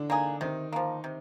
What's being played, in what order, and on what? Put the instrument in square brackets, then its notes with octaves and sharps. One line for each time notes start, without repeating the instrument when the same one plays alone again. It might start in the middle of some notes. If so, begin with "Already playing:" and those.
Already playing: [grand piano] D3 E3 D4
[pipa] A#3 D#4 G#4
[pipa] C3 [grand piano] D#3 D#4
[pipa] F3 A#3
C3